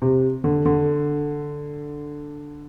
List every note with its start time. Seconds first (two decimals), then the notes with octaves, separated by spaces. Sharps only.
0.02 C3
0.44 D3
0.65 D3